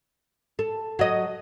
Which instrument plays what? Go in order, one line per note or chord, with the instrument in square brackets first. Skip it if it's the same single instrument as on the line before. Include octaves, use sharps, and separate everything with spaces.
[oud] A4
F#3 D#5